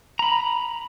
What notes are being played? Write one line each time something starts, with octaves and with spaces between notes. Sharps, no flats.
A#5 B5